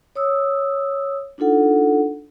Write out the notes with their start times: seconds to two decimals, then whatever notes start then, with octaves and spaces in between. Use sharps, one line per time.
0.16 C#5 D#6 E6
1.38 D4 D#4 F4 A4 F#5